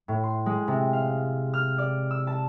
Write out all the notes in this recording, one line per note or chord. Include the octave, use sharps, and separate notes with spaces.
A2
C6
G#3
C3
F5
F6
D5
E6
A5